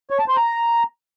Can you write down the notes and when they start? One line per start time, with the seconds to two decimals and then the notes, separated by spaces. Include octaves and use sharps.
0.10 C#5
0.19 A5
0.28 C5
0.37 A#5